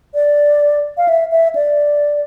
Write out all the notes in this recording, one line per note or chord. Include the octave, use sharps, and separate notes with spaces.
D5
F5
E5
E5
D5